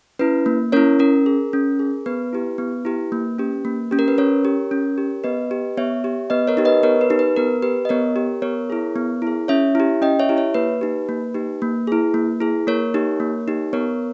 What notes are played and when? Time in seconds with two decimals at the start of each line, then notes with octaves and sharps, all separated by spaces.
0.19 C#4 E4 B4
0.46 A#3
0.72 C#4 E4 A#4 C#5
0.99 C#4 A#4
1.26 G#4
1.53 C#4
1.79 G#4
2.06 B3 B4
2.33 E4 G4
2.58 B3
2.85 E4 G4
3.12 A#3
3.39 C#4 G4
3.65 A#3
3.91 C#4 G4
3.99 A#4
4.08 B4
4.18 C#4 A#4 C#5
4.45 G4
4.71 C#4
4.98 G4
5.24 B3 B4 D#5
5.51 G4
5.77 B3 C#5 E5
6.04 G4
6.30 B3 B4 D#5
6.47 A#4 C#5
6.57 D#4 G4
6.65 B4 D#5
6.83 B3 A#4 C#5
7.01 B4
7.10 D#4 G4
7.19 B4
7.36 B3 A#4
7.62 G4 B4
7.85 D#5
7.89 B3 A#4 C#5
8.16 G4
8.42 B3 A#4 C#5
8.70 E4 G#4
8.96 B3
9.22 E4 G#4
9.48 C#4 C#5 E5
9.75 E4 G4
10.02 C#4 D#5 G5
10.19 C#5 E5
10.29 E4 G4
10.37 C#5 E5
10.54 A#3 B4
10.81 D#4 G4
11.09 A#3
11.34 D#4 G4
11.62 A#3
11.87 E4 G#4
12.14 A#3
12.40 E4 G#4
12.67 A#3 A#4 C#5
12.94 D#4 G4
13.20 A#3
13.48 D#4 G4
13.73 B3 A#4 C#5